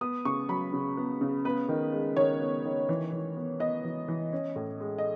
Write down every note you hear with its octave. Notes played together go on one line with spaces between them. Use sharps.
B3 D#6
C#3 C#6
F#3 B5
C#3
B3
C#3
B3 B4
D#3
G#3
D#3 C#5
B3
D#3
E3
E3
B3
B3 D#5
E3
E3
C#4
A2
G#3
D#5